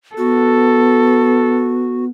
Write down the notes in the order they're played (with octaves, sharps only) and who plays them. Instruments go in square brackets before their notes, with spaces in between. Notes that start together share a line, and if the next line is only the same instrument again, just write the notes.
[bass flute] B3 [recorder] F#4 [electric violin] A4